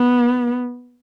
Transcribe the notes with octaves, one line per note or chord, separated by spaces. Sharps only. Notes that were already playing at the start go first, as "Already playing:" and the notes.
Already playing: B3